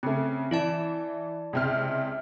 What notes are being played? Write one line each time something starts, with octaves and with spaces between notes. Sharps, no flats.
C#3 A3 C4
E3 E4 D5 A5
C#2 C3 F6